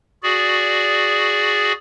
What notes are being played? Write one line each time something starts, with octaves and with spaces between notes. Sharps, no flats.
F#4 G#4 D5